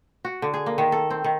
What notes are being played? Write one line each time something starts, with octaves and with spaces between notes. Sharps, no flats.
F#4
D3
G#4
A#3
D#3
A4
C4
D#3